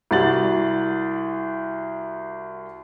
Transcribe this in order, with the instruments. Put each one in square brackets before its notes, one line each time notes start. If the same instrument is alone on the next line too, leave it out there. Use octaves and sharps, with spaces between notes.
[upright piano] C2 F#4 A6 F#7